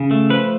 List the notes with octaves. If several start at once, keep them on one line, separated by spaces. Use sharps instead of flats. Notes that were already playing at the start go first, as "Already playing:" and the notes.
Already playing: C#3
A3
F3 B4